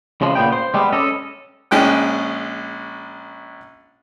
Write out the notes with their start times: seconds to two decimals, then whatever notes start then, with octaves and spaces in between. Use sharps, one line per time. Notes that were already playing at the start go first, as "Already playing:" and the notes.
0.22 C#3 F3 G#3
0.35 A#2 C#3 B3 G5
0.53 C5
0.74 G3 G#3 B3
0.92 C#4 A4 D#5
1.71 A#1 G#3 C#4 G5 F#6